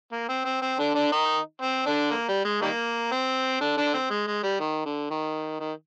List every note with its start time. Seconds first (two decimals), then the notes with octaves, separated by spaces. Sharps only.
0.12 A#3
0.29 C4
0.45 C4
0.62 C4
0.79 D3 D4
0.95 D3 D4
1.12 D#3 D#4
1.62 C4
1.86 D3 D4
2.11 A#3
2.28 G3
2.45 G#3
2.62 D#3 G3 A#3
3.12 C4
3.61 D3 D4
3.77 D3 D4
3.94 C4
4.10 G#3
4.27 G#3
4.43 G3
4.60 D#3
4.85 D3
5.10 D#3
5.60 D#3